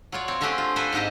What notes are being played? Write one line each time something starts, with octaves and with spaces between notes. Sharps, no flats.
F#3 F4 C#5 D5
C4 C#5
D3 A3 C4 D4 G4 G#4
F4
A4 B4 C5 G5 G#5
G#2 C4 G4 D#5 A#5